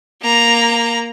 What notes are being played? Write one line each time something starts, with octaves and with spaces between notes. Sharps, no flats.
A#3 A#5